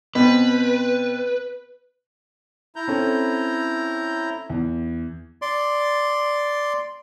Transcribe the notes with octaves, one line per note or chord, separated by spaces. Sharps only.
B2 B3 C4 B4
E4 A#5 G6
C4 C#4 A4
E2
D5 C6